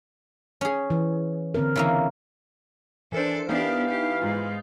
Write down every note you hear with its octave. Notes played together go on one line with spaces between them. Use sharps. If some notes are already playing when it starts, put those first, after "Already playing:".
C#4 G#4
E3
D3 C4 A#4
C#3 E3 A#3
E3 D4 A4 A#4 C5
E3 B3 D4 D#4 G4 F5
G4
G#2 D#4 F4